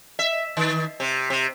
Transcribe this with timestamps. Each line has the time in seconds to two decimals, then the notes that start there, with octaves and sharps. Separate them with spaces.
0.19 E5
0.57 D#3
1.00 C3
1.30 C3